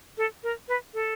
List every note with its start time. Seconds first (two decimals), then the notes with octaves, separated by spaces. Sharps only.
0.18 A4
0.43 A#4
0.68 B4
0.94 A4